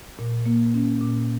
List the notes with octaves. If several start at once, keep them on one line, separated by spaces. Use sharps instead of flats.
A#2
A#3
C#4
A#2